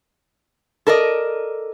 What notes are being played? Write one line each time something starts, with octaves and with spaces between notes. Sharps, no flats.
A4 A#4 D5 D#5